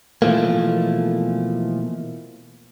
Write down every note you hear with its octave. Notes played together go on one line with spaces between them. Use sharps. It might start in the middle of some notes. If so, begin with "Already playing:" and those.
B2 E3 F3 A3 A#3